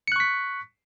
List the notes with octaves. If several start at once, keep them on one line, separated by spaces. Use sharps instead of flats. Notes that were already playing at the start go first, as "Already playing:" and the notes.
C#6 F#6 B6 C#7